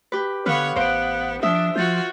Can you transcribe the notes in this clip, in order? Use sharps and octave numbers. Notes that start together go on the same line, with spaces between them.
G4 B4
D3 B3 B4 C#5 F5 F6
A1 B3 C5 F5 F#6 D7
F3 D4 E5 D#6
F3 F4 F#4 G6 A6 F#7